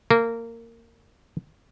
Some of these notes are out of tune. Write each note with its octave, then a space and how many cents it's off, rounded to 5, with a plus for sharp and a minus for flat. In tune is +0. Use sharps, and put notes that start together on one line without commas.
A#3 -20